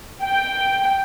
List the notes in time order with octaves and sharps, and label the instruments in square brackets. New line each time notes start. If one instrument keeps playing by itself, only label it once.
[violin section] G5